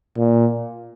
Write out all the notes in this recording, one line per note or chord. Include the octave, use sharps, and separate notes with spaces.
A#2